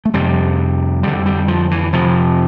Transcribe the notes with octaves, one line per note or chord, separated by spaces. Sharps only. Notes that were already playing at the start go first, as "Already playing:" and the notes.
A3
F2 C3 G3
F2 D3 G3
G3
F3
E3
F2 C3 F3